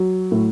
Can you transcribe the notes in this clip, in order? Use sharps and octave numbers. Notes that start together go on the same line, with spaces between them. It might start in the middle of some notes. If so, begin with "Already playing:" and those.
Already playing: F#3
A2